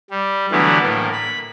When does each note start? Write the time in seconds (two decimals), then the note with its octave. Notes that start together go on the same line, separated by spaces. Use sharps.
0.11 G3
0.51 D3 E3 F#3 G3 A3 B3
0.82 A2 A#3
1.12 B5